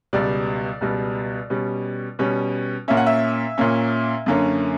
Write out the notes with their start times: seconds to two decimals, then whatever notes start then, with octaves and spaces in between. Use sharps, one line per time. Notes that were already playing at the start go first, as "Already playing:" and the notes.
0.13 C#2 B2 G3 D5
0.81 C#2 B2 G3
1.50 B2 G3 C#4
2.19 B2 G3 C#4
2.88 A#2 A#3 C#4 E5
2.97 F#5
3.07 E5
3.58 A#2 A#3 C#4
4.26 F#2 D3 A#3 C#4